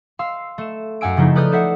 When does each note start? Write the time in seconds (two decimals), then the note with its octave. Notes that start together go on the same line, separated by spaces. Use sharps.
0.19 F5 C6 E6
0.58 A3 E7
1.01 F#2 F5 F#5 G#5 E6 D7
1.17 C#3 F3 A3 D#4 E4
1.35 A4 B4 D5 D#6 F6 G6
1.52 A4 C5 E5 F#5